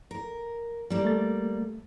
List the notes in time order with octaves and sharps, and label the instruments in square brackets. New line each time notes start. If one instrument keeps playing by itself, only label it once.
[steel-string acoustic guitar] A#4
G3 A#3
[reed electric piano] A3 A6